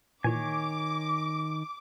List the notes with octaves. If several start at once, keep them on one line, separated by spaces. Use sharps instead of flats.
A#2 D#3 E3 C#5 G#5 D6